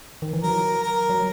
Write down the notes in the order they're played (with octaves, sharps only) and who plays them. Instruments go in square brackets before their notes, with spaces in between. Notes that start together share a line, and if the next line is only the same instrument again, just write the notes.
[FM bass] D#3
E3
[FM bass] F#3 [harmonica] A#4
[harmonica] A#4
[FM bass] F#3